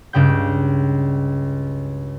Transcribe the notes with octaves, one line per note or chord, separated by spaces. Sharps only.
C#2 G2 C#3 G5 G6